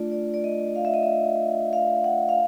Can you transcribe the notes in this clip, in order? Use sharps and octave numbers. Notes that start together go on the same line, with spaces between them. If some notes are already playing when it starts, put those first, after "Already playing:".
Already playing: A3 D4 F4 D5
D5
D5
D#5
F5
E5
D#5
E5
F5
F#5
F5